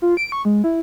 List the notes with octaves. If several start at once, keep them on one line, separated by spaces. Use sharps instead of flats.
F4
D7
C#6
G#3
E4